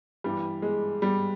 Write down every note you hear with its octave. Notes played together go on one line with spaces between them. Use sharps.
G2 E3 G3
G#3
G3